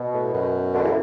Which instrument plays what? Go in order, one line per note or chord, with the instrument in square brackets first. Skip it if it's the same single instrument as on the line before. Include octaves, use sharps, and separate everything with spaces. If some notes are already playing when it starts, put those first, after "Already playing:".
Already playing: [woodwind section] B2
[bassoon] A2
F#2
[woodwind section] B2 D3
C#3 E3